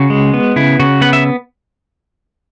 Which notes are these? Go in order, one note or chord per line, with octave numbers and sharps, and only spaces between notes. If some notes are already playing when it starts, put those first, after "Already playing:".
Already playing: C#3 F#4
G#3
B3
C#3 E4
C#3 F#4
B3 F#5
E5